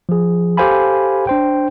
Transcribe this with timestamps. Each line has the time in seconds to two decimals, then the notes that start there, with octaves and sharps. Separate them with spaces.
0.09 F3 G#4
0.57 G4 A4 C5 F5 G#5 B5
1.27 D4 C5 G5